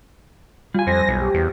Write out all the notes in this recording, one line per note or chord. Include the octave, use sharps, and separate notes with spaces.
G3 F4 G#5
F2 C5 A#6
B1
G4
E2